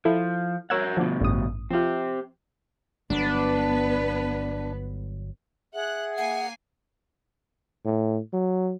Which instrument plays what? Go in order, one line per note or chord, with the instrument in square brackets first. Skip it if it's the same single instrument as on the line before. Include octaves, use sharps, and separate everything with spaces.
[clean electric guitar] F3 [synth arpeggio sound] E4 A4
[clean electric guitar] F#4 A#4 F#5 [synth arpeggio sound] C#5 E6 G#6
[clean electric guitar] D2 B2 [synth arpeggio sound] F3 D4
[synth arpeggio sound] A1 G2 D#6
[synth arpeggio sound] F3 F4 [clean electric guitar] C4 G4
[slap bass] G1 F#3 [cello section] B3 B4 [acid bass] D4
[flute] G#4 [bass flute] E5 [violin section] F#5 F#6
[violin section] A#3 G#5 C7 [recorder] F#5
[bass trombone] A2
F#3